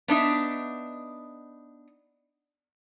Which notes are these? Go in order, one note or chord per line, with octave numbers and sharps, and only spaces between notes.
B3 D4 D#4 E5